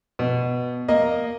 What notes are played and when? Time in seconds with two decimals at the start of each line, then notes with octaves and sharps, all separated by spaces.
0.19 B2
0.88 A#3 D#5